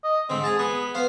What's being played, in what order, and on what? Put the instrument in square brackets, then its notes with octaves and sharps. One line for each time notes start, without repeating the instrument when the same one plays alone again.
[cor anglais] D#5
[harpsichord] G#2 D3 [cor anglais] C4
[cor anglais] G#4 [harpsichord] A5 A#5
[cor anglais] B3 [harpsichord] G#4
[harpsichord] B3 C5 F5